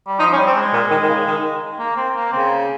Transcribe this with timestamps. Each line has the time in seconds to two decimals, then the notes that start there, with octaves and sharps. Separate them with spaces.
0.07 G3
0.19 F3 D#4
0.33 C#4
0.37 G3
0.47 C4
0.56 G#3
0.73 A#2
0.91 D#3
1.03 D#3
1.08 C#3
1.26 D#3
1.79 A#3
1.97 C4
2.16 A#3
2.33 C#3 C4